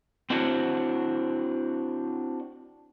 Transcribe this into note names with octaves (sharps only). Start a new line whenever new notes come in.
C4 D4 E4 F#4 C5